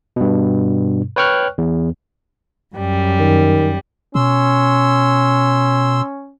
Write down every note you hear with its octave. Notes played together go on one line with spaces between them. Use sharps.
G2 B2
B4 C#5 G5 C#6 F6 F#6
E2
F#2 G3
D#3
B2 C#4 C6 E6